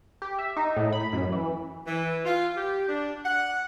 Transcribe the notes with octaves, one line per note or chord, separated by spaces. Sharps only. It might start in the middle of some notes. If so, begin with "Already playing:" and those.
G4
E5
D#4
A2
B5
F#2
E3
E3
F4
G4
D4
F#5